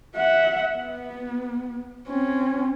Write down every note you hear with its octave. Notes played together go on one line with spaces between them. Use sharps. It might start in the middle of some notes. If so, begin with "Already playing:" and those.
E5 F#5
B3
C4 C#4